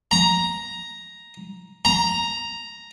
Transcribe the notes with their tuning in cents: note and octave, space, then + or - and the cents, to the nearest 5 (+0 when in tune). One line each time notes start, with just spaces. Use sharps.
A#5 +5
A#5 +0